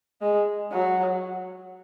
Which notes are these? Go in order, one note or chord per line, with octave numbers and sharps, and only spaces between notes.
G#3
F#3